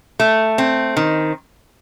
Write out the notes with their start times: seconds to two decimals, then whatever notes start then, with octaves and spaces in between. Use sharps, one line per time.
0.20 A3
0.58 C4
0.97 D#3